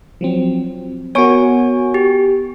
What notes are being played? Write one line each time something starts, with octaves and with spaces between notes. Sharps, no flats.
F3 F#3 C4
B3 F#4 A#4 C#5 G#5 C#6 D7
G4